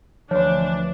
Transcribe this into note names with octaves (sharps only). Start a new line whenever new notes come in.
D2 E3 F3 D4 C#5